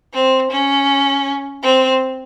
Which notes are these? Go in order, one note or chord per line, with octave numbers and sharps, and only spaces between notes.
C4
C#4
C4